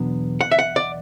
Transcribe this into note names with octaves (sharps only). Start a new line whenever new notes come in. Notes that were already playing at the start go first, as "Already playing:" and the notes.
Already playing: E2 B2 F#3 B3 D4
F#5
E5
F#5
D5